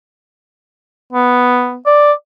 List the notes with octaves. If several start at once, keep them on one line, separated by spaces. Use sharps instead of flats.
B3
D5